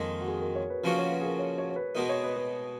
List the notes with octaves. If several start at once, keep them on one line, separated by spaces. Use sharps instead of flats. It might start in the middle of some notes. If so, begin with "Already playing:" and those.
Already playing: F2 D#3 G#3 A#3 D#4
F#4
G#4
A#4
C#5
B4
C#3 F3 A#3 C#4 F#4 B4
C#5
B4
G#4
A#4
C#5
C#5
C#5
B4
B2 G#3 B3 D#4 A#4
C#5
B4
B4